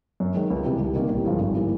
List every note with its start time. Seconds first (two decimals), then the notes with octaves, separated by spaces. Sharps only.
0.20 F#2
0.34 D#3 G#3
0.50 C#2
0.66 C3 E3 G3
0.81 C2
0.95 C3 D#3 G3 A#3
1.11 A1
1.26 G2 D3 F3 G#3
1.41 G#1
1.56 E3 G3 A#3